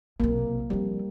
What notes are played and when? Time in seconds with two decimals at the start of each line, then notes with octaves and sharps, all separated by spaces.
0.20 B1 C3 A#3
0.70 F3 G3 C4